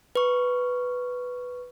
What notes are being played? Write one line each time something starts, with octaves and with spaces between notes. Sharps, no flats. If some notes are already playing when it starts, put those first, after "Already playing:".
B4 C#6